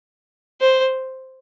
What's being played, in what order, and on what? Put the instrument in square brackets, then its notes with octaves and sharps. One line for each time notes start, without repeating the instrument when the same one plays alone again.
[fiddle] C5